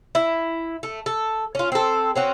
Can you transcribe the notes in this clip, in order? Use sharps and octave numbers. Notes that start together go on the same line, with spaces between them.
E4
A3
A4
C#4 F4
C4 A4
C4 C#4 F#4